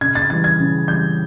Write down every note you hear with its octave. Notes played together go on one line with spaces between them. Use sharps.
C#3 G#6
A6
E3 G3 A6
G#6
C#3
E3 G3 G6